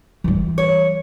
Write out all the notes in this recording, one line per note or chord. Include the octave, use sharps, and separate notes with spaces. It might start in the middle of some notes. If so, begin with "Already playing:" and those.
E3 G3
C#5